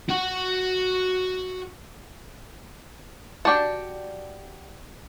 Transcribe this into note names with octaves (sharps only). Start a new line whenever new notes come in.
F#4 F#5
F#4 G4 D5 G5 A5